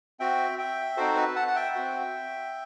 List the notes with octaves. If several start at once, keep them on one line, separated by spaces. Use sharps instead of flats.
C4 F#4 E5 G5
E5 G5
C4 D#4 F#4 A4 C5
B4
F#5 A5
F#5
E5 G5
C4 F#4